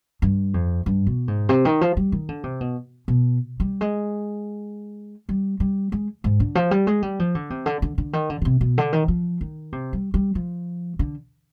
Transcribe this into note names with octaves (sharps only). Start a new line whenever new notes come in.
G2
F2
G2
B2
G#2
C3
D#3
F3
G3
D#3
D3
C3
B2
B2
G3
G#3
G3
G3
G#3
G#2
D3
F3
G3
G#3
G3
F3
D3
C3
D3
D3
D3
D#3
D3
D3
C3
B2
D3
D#3
F3
D#3
C3
G3
G3
F3
D3